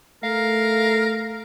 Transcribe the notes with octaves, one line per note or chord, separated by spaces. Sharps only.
A3 A#4 F5